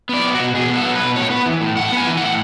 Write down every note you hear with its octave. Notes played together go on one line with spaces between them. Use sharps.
B3 D5
F#3
F#4
B2
B2 G#4
B3
A4
F#3
B4
B2
A2 C#5
B3 B4
E3
A2
A2 F#5
B3 G#5
E3
A2 F#5